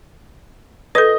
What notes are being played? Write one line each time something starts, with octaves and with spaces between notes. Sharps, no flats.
A4 B4 D#5